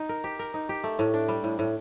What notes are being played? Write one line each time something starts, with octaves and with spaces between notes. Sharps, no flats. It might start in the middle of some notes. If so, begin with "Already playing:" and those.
Already playing: D#4
A#4
G4
A#4
D#4
G4
A3
A2
D4
G3
A2
A2